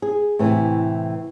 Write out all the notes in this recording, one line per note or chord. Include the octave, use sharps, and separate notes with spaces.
G#4
A2 C3 E3